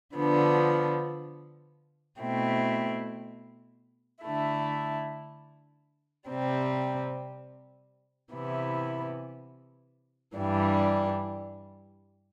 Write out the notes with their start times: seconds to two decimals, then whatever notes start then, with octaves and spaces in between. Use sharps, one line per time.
0.15 D3 F3 B3 D4
2.20 B2 A3 C4 E4
4.23 D3 A3 E4
6.28 C3 G3 C4
8.33 C3 E3 B3 E4
10.36 G2 E3 G3 D4